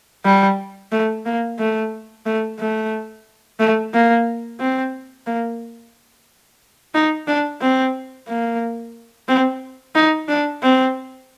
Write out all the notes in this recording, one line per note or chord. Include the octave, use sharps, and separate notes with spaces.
G3
A3
A#3
A3
A3
A3
A3
A#3
C4
A#3
D#4
D4
C4
A#3
C4
D#4
D4
C4